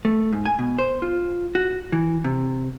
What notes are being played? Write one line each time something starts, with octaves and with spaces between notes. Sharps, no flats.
A3
G#2
G#5
B2
C5
F4
F#4
E3
C3